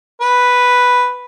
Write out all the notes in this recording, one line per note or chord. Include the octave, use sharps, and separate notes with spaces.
B4